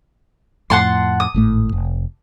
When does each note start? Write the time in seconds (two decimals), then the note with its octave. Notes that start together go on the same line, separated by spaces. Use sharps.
0.70 F2 A2 F#5 A5 C6
1.20 D#6
1.34 G#1 A2 A3
1.72 F1